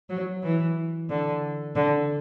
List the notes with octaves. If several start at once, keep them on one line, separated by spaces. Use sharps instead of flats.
F#3
E3
D3
D3